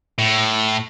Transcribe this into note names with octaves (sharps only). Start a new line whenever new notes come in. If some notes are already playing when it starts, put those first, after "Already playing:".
A2